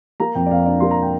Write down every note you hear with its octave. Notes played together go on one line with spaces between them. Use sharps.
A#3 A#5
F2 G5
D5
F2 F5
D4 D5
A#3 C6
A#5
G5